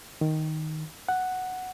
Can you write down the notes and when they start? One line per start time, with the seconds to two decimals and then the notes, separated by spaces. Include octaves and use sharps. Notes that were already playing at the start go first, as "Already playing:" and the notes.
0.21 D#3
1.09 F#5